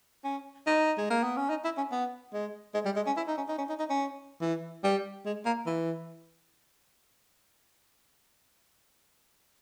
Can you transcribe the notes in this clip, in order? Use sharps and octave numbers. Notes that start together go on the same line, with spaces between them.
C#4
D#4
G#3
A#3
B3
C#4
D#4
E4
C#4
B3
G#3
G#3
G3
G#3
C#4
E4
D#4
C#4
D#4
C#4
D#4
D#4
C#4
E3
G3
G#3
A#3
E3